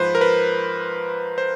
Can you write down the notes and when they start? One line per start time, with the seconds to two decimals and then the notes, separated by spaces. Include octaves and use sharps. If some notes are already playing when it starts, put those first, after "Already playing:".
Already playing: G#2 F3 B4 C5
0.15 A#4
0.21 B4
1.38 C5